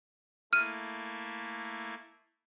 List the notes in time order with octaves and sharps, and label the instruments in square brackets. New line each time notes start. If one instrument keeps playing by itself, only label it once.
[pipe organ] A3 A#3 E4 [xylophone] F6 D#7